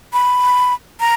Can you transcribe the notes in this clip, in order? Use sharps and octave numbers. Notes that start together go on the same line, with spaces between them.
B5
A#5